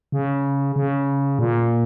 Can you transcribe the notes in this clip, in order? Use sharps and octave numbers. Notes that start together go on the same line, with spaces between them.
C#3
C#3
A#2